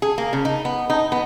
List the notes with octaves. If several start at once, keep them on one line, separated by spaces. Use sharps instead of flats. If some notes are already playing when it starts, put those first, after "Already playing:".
G#4
A#3
C#3
D#4
B3
D#4
B3